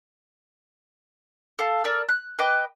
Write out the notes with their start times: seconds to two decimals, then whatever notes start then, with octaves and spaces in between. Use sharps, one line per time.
1.59 A4 F5 A5
1.84 A4 A#4 D5 E6
2.09 F#6
2.39 B4 D#5 G5 D6